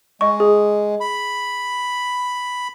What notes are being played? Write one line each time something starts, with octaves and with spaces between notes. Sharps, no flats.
G#3 D#5 C#6
G#4
B5